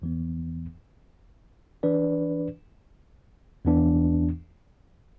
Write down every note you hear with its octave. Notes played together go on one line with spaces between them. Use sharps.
E2 E3 B3
E3 D4 B4 D5
E2 E3 B3 D4